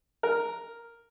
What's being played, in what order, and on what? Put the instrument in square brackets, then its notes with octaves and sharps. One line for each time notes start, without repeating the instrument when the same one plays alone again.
[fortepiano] A#4